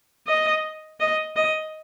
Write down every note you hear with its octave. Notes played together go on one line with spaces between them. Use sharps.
D#5
D#5
D#5